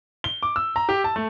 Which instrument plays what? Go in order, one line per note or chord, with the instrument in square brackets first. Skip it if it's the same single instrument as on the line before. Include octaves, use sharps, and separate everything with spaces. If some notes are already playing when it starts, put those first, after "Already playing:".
[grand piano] G7
D6
E6
A#5
G4
A5
A3